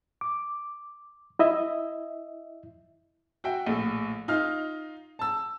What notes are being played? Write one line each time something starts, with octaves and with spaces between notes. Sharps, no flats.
D6
E4 D#5 E5
F#4 E5 G5
A#1 A2
D#4 F4 F6
A5 E6